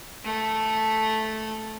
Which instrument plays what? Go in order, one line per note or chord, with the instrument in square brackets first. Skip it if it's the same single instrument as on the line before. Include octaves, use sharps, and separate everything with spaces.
[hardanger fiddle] A3